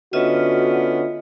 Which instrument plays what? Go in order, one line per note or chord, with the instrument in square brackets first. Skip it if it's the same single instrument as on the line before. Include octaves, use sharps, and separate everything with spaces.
[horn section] D3 B3 C#4 [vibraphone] F4 D#5 E5 [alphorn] F#4